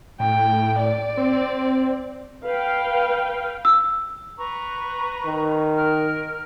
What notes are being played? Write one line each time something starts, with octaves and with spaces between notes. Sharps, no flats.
A2 G5
D5
C4
B4 F5 G5
E6
B4 A#5 C#6
D#3
A#4 F6